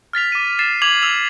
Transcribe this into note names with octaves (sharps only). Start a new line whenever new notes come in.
F6 A6 B6 F7
D6 D#7
A6 C7 E7
D6 G#6 C7 F7 F#7
E6 F7